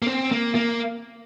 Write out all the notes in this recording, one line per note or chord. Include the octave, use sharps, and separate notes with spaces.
A#3
C4
A#3
A#3